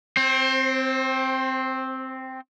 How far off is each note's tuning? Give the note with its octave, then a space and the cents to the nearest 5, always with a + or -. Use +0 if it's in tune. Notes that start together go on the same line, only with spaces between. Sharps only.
C4 +0 C5 +30